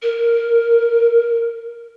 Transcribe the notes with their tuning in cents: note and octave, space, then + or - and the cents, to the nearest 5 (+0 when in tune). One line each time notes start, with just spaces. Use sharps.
A#4 +0